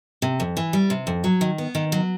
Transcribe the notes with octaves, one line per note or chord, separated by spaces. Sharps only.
C3
F2
E3
G3
C3
F2
F#3
D#3
B3
D#3
F#3